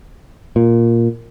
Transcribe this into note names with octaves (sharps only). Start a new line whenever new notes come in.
A#2